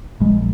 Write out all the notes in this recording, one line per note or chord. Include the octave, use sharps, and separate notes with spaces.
A#1 G#3